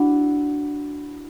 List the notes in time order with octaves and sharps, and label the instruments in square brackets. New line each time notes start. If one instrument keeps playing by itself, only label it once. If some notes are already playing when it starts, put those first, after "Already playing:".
Already playing: [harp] D4 E4 F#4